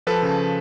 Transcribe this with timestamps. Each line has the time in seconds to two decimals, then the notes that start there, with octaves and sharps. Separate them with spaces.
0.07 F3 A4 B4
0.22 C#3